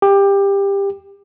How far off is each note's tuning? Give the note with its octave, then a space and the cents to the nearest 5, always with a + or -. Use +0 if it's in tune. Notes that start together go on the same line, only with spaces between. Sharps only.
G4 +20